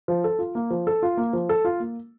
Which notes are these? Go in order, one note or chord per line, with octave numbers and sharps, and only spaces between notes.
F3
A4
F4
A#3
F3
A4
F4
A#3
F3
A4
F4
A#3